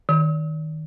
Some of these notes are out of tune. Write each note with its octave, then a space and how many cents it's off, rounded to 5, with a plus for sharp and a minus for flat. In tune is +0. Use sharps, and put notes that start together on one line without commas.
D#3 +5